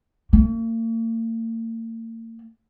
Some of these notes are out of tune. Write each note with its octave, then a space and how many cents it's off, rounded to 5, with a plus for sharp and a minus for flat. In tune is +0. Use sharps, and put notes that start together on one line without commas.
A#3 -45